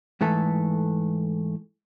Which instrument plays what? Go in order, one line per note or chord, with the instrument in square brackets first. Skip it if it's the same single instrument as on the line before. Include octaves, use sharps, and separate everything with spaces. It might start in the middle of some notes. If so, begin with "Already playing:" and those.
[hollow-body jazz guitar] G#2 E3 A3 A4